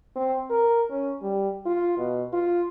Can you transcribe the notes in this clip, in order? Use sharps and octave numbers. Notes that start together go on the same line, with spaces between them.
C4
A#4
C#4
G3
F4
B2
F4